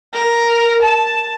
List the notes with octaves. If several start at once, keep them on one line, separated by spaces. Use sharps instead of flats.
A#4
A5